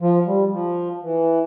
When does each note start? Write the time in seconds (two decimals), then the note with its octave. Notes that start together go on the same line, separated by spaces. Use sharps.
0.01 F3
0.27 G3
0.53 F3
1.03 E3